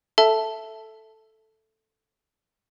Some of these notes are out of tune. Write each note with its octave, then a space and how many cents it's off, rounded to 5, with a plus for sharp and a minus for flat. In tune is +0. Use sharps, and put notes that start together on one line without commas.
A4 +0 E5 +0 A5 +0